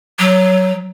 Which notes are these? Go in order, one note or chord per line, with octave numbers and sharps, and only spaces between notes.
F#3